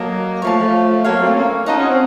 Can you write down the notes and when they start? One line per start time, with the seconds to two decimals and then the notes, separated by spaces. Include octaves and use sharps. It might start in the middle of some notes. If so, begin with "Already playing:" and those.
Already playing: F#3 A#3 A4 D#5 A#5
0.42 F3 A3 C#5 F5 A5
0.57 F3 A3
1.04 F#3 A#3 A4 C#5 F5
1.19 A3 C4
1.36 A#3 C#4
1.66 D#4 F4 A4 D#5 F#5
1.78 C#4
1.88 C4